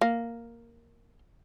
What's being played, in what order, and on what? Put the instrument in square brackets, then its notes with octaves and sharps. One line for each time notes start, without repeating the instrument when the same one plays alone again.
[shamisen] A#3